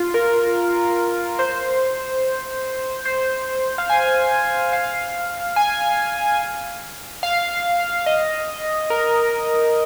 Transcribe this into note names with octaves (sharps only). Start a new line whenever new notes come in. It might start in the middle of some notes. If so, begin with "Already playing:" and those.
Already playing: F4
A#4
C5
C5
F5
G#5
F5
G#5
F5
D#5
A#4